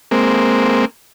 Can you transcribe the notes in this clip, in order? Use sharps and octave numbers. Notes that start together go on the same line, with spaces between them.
G#3 A#3 C4